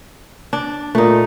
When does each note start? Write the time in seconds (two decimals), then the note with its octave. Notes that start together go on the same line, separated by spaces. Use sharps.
0.53 D4
0.95 A#2 A3 D#4